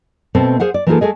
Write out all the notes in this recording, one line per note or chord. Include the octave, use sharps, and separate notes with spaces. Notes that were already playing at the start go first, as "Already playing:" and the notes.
B2 A3 C4 C5
G#4 C5 F5 F#5
D5
E3 A#3 D#4 F4 G#4 A4
G#3 A3 G#4 D#5